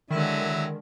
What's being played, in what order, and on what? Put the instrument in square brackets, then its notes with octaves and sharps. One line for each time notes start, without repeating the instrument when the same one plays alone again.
[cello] D3 G#3 [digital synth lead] D#3 [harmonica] F#3 E4